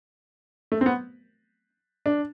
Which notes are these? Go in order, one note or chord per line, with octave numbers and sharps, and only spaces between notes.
A3
C4
B3
D4